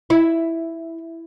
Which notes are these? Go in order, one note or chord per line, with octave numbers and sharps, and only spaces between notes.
E4